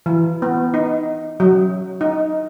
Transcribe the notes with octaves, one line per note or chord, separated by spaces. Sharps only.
E3
B3
D#4
F#3
D#4